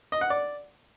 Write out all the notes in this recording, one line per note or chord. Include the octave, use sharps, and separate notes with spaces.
D#5
F#5
D5